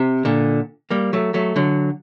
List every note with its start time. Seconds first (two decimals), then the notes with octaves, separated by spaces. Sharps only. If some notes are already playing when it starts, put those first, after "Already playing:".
Already playing: C3
0.25 A#2 D3
0.90 G3 A#3
1.13 F#3 A3
1.34 F#3 A3
1.56 D3 F#3